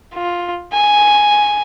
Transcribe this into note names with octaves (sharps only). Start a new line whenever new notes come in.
F4
G#5